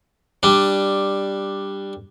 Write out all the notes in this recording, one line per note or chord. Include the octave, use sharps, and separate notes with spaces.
G3 D4